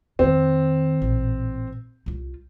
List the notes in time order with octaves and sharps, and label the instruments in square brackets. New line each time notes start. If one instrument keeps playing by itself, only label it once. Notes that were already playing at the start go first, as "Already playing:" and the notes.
[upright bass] F2 D#3 [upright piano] C4
[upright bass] A1 A#2
C2 F4